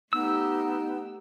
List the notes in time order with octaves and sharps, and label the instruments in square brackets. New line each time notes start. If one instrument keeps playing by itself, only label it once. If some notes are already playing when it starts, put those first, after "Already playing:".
[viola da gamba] A3 G4 [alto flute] B3 [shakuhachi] D#4 [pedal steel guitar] E6